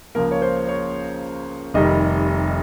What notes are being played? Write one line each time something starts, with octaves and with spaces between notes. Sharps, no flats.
C#2 C#3 F3 A#3 A#4
C#5
C5
C#5
F1 F2 D#3 G3 D#5